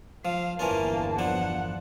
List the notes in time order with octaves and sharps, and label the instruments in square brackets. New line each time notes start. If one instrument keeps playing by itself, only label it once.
[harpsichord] F3 [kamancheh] F5
[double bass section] G1 E2 [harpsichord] E3 C#4 F4 [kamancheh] A#3 A5
[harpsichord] F3 D4 [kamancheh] F#5